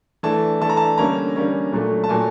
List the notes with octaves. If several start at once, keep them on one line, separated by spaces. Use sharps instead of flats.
E3 A3 D4 A5
E3 A3 D4 A5
A#5
A5
D3 G3 A#3 C#4 A#5
D3 G3 A#3 C#4
A#2 F#3 A3
A5
A#2 F#3 A3 G#5